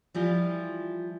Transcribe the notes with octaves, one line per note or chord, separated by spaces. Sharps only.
E3 F3 G3 F4